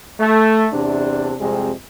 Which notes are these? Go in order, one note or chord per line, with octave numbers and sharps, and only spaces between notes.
A3
E2 C3 D4
F2 C3 G3 G#3